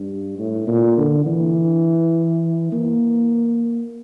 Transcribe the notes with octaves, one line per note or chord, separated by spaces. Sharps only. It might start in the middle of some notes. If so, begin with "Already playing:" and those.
Already playing: G2
A2
A#2
D3
E3
A#3